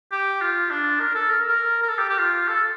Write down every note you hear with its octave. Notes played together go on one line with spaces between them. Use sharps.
G4
F4
D4
A#4
A4
A#4
A#4
A#4
A4
G4
G4
F4
A4